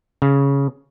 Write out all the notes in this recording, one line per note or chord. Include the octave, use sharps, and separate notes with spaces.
C#3